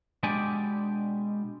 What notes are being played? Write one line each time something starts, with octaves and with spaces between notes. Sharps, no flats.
B2 G#3 D4 G4 D5 G#5